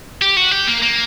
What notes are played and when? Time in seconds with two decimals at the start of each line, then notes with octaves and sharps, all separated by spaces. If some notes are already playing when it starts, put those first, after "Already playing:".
0.22 G4
0.37 F#4
0.51 G4
0.67 A#3
0.82 A#3